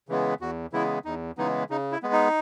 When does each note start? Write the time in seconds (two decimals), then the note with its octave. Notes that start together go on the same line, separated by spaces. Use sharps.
0.09 C#3 E3 G#3 B3
0.40 E2 F#4
0.73 C#3 E3 G#3 B3 E4
1.05 E2 D#4
1.38 C#3 E3 G#3 B3 D#4
1.70 C#3 D#4
1.92 E4
2.03 G#3 B3
2.13 D#4